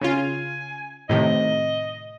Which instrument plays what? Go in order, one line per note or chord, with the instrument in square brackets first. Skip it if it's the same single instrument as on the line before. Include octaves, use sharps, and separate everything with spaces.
[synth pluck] C#3 C#4 F4 [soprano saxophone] G#5
[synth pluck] A2 C3 D#3 [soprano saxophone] D#5